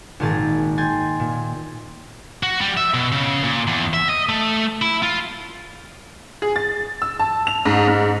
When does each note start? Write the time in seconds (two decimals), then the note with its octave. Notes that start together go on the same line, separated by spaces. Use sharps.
0.20 G#1 A#2 D#3 G#4 A#4 A6
0.78 G5 G#5 C6 A6
1.20 A#2
2.43 F#4
2.61 G3
2.77 E5
2.94 B2
3.12 C#3
3.44 A#2
3.68 E2
3.94 E5
4.09 D#5
4.29 A3
4.82 E4
5.03 F4
6.42 G#4
6.56 A6
7.02 E6
7.20 A5
7.47 F7
7.65 G#2
7.88 G#2